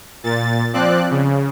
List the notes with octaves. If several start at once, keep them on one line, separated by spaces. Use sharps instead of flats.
A#2 A6
F3 C4 D5 F#6
C#3